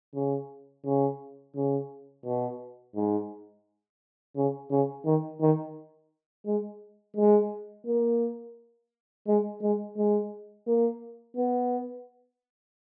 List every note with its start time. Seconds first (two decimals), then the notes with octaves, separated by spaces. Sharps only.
0.15 C#3
0.85 C#3
1.56 C#3
2.25 B2
2.95 G#2
4.36 C#3
4.71 C#3
5.05 D#3
5.41 D#3
6.46 G#3
7.17 G#3
7.86 A#3
9.27 G#3
9.62 G#3
9.97 G#3
10.67 A#3
11.37 B3